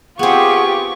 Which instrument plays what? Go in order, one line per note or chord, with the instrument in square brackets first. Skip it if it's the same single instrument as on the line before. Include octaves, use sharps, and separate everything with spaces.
[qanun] B3 C4 [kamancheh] F4 G4 [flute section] G#4 F#5 [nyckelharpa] C#6